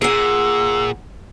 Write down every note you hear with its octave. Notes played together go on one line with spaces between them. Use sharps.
A#2 G#4 F#5 E6